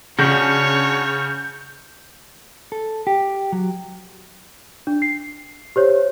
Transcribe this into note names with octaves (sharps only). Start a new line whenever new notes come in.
C#3 C#4 D4 F#4 C#5 G6
A4
G4
F#3
D4
C7
G4 C5 C#5